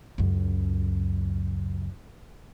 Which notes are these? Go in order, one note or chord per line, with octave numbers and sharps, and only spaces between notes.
C#2 F#2